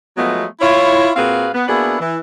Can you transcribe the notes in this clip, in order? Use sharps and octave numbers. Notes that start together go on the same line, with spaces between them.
F3 F#3 G#3 A3 B3
E4 F4 C#5
A#2 C4 F#4 G#4 B4 F5
B3
A#3 B3 D4 E4 F#4 G#4
E3